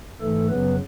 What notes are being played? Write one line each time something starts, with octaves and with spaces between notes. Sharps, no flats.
G#2 E3 A3 A4
F#2 C#3 F#3 B3 B4